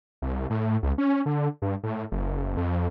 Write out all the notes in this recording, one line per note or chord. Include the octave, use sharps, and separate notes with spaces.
C2
A2
C#2
C#4
D3
G2
A2
F#1
F2